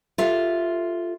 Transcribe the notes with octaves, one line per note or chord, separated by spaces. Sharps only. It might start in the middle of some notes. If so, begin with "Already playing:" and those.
F4 G4 A4 E5